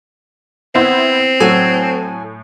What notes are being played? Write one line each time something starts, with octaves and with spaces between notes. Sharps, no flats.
B3 C4 E4 C5
A2 F#3 F#4 A4 G#5